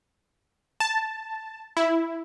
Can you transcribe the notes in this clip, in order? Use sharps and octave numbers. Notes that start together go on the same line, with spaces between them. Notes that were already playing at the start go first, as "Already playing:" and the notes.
A5
E4